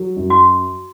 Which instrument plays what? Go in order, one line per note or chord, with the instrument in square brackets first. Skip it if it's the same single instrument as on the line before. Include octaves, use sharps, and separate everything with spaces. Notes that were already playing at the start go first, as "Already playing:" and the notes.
Already playing: [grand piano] F#3
F#2
[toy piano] F#4